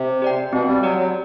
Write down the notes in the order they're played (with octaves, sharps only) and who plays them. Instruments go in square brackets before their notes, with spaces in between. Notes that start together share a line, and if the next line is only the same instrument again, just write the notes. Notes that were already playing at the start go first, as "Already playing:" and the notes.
Already playing: [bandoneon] C3
[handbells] G4 D5 G5
[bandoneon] B2 [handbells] C4
[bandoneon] G3
[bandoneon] F#3 [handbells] G4 D5
[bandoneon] F#3